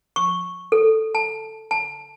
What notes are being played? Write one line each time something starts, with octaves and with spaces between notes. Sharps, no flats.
C#6
A4
A5
A5